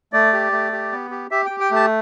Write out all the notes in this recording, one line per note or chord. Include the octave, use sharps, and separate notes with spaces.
A3 D5
G4
A3
G4
B3
G4
G4 E5
G4 G5
G5
A3 A5